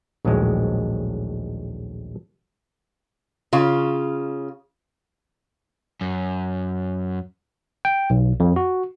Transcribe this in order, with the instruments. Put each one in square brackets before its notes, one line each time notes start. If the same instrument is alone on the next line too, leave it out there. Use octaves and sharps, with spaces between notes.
[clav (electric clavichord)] A#1 D#2 A2 F#3 G#3
[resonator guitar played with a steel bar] C#3 F4
[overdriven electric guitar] F#2
[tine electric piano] G5
B1
F2
F#4